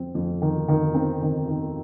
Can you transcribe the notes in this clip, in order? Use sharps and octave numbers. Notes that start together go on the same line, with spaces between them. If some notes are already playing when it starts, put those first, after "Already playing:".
Already playing: F2 C4
F2
D#3
D#3
C4
D#3
D#3